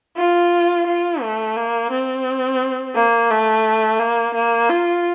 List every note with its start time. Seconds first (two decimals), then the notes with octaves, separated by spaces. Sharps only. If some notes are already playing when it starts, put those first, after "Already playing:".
0.17 F4
0.87 F4
1.22 A3
1.57 A#3
1.91 C4
2.95 A#3
3.30 A3
3.99 A#3
4.34 A#3
4.69 F4